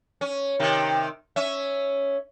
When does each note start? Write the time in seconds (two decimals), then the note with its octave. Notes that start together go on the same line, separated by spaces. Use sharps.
0.21 C#4
0.60 C3 D#3
1.36 C#4 E5